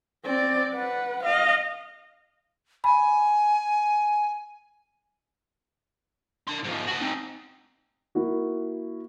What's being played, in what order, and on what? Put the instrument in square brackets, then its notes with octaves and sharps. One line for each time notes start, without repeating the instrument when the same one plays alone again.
[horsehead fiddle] C4 D5
B4 F#5
D#5 F5
[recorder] G#5 [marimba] B5
[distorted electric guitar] D4 C6
G#2 F3
F#4 A5
C4 D#4
[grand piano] A#3 E4 F#4